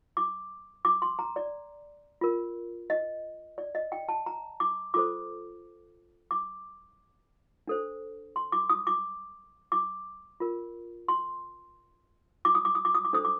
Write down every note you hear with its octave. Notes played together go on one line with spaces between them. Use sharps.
D6
D6
C6
A#5
D5
F4 A#4
D#5
D5
D#5
G5
A5
A#5
D6
F4 A4 C5 D6
D6
D4 A4 C5
C6
D6
D#6
D6
D6
F4 A#4
C6
D6
D#6
D6
D#6
D6
D#6
D6
D4 A4 C5 D#6
D6